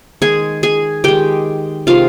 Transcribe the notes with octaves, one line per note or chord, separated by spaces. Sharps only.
D#3 G#3 G#4 G#5
G#4 G#5
D#3 G#3 G4 G5
C3 D#3 G#3 F4 F5